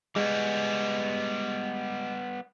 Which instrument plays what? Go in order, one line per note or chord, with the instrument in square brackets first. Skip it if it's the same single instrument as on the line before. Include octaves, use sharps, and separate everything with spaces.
[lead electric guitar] G3 B3 [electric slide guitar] G#3